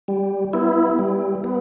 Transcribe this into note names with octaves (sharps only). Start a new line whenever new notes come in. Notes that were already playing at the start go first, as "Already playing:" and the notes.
G3
B3 E4
G3
B3